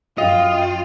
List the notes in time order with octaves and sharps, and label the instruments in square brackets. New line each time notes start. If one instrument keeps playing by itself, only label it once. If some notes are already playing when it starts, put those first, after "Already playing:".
[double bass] F#2 [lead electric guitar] F4 [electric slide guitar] D#5 [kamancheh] G5